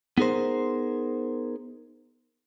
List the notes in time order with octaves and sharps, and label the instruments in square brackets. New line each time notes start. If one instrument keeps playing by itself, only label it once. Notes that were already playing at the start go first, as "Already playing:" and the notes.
[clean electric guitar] B3 D#4 G#4 A#4 C5